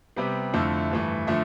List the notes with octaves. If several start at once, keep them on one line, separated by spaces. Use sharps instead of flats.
C3 G3 B3
F2 D3 A3 E4
G2 E3 A3
D3 F3 A3